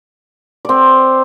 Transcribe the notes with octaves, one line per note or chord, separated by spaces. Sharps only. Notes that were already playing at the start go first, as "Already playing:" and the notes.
C4 D5